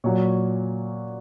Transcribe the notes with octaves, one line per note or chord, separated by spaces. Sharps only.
A#2 F#3 C#5